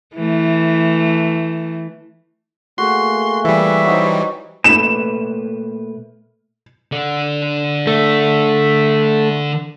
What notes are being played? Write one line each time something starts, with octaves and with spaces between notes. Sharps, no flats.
E3 A3
A3 A#3 F#4 G#4 C6
E3 G3 E5
F#3 D#4 C5
A#2 A3 B4 E7
D3
A3